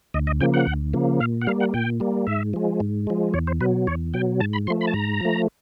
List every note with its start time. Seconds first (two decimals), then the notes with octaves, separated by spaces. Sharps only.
0.14 D2 D#5
0.27 D#5
0.40 C#3 F3 A#3 G5
0.54 F#5
0.67 D2
0.94 C#3 F3 A#3
1.20 A#2 F5
1.42 F#5
1.47 G3 A#3 F5
1.60 F#5
1.74 A#2 G5
2.00 G3 A#3
2.27 G#2 E5
2.53 F3 G#3
2.80 G#2
3.07 F3 G#3
3.34 E2 C#5
3.47 C5
3.61 B2 F#3 B4
3.87 E2 C#5
4.14 B2 F#3 G5
4.40 G#2 A5
4.53 B5
4.67 F3 A3 C6
4.81 B5
4.87 A5
4.93 G#2 A#5
5.20 F3 A3